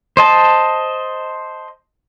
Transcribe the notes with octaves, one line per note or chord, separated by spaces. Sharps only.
C5 D#5 A5